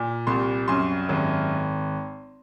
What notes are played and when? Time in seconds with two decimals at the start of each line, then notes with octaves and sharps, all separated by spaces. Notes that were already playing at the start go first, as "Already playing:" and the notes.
Already playing: A#2
0.27 C2 C6
0.68 F#2 C6
1.09 G#1